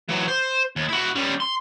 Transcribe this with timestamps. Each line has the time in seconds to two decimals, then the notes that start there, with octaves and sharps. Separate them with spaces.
0.09 E3 F#3
0.28 C5
0.76 D#2
0.88 E4 F#4
1.15 G3 C#4
1.40 C6